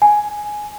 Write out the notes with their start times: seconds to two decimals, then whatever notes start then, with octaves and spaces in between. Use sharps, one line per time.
0.02 G#5